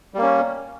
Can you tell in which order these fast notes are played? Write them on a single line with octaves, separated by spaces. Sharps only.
G3 A#3 C#4